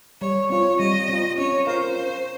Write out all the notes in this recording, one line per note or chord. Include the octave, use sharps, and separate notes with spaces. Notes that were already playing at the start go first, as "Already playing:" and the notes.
G3 C#5
C4 F4 C#5
G3 D#5
C4 F4
C#4 C#5
F4 A#4 C5 F5
C#4